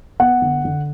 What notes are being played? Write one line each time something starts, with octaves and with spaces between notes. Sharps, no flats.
B3 F#5
D3
D3